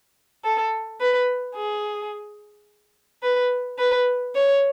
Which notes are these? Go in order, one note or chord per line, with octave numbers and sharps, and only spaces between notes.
A4
B4
G#4
B4
B4
C#5